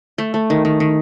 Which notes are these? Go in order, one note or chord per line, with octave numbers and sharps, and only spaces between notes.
A3
A3
D#3
D#3
D#3